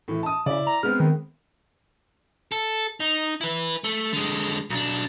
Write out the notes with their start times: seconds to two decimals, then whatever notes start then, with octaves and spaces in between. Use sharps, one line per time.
0.08 A2 E3
0.23 A5 D#6
0.46 C#3 E4 D5
0.67 A#5
0.83 G#3 B3 C4 F6
1.00 D#3
2.52 A4
3.00 D#4
3.41 E4 B4
3.84 A3
4.13 D3 G#3
4.70 B1 D4